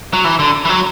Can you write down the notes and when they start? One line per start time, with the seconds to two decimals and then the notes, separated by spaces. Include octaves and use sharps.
0.13 F#3
0.24 E3
0.39 D3
0.65 E3
0.69 F#3